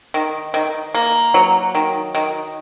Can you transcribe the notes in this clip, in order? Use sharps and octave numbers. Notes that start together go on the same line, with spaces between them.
D#3
D#3
A#3
F#3
D#3
D#3